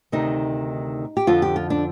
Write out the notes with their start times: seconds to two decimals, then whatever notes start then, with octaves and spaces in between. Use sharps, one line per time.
0.12 D2 C3 D#3 D#4
1.17 G4
1.27 F2 D3 F3 F4
1.42 G4
1.56 F4
1.70 D4